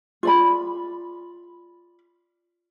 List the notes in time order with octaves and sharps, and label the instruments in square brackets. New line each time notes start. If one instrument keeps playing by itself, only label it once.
[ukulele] F4 D5 B5